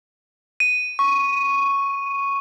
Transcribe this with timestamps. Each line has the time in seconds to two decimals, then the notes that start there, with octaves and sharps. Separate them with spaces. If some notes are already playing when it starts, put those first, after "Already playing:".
0.60 D#7
0.99 C#6